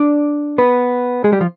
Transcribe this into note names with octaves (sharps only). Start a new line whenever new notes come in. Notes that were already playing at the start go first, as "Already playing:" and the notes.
Already playing: D4 D5
B3 B4
G#3 G#4
G3 G4
F3 F4